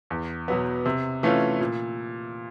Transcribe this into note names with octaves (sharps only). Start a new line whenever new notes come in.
E2
B2 F#3 B3
C3
E3 A3 C#4 F4
A#2